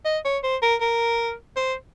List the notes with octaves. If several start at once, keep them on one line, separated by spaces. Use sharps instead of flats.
D#5
C#5
C5
A#4
A#4
C5